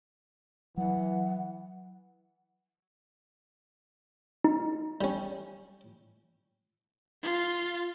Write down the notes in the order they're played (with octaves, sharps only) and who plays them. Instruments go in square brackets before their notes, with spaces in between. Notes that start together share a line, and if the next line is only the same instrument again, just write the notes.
[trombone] E3 [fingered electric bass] F#3 [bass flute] F#5
[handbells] D#4
[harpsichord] G3 C#4
[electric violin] F4